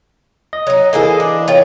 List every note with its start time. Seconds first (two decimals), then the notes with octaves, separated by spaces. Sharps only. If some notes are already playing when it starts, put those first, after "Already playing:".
0.53 D#5
0.67 F#3 D#4
0.93 E3 A#3 G#4 A4 D#5
1.20 D4
1.48 F4 C#5 G5